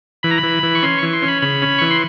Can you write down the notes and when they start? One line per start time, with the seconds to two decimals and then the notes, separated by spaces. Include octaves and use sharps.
0.23 E3 B5
0.31 A#5
0.38 B5
0.43 E3
0.63 E3
0.75 C#6
0.83 C#4 C6
0.98 E3 C#6
1.13 C6
1.22 C#4
1.28 B5
1.42 C#3 B5
1.62 C#4
1.78 E3 C#6
1.91 C6